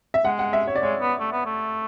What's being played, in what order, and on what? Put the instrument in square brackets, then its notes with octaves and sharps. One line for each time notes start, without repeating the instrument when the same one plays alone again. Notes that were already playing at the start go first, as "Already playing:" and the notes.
[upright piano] E5
[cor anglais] G#3 [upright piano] F#5
[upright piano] F#5
E5
C#5
D5
[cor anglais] G#3 [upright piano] C#5
[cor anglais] B3
A3
B3
A3